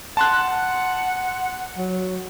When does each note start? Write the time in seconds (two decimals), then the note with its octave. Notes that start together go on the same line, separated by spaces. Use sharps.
0.17 F#5 A5 C6 F#6
1.77 F#3